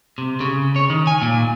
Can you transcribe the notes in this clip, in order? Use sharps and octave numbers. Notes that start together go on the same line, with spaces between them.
C3
C#3
C#5
D#3
G#5
A#2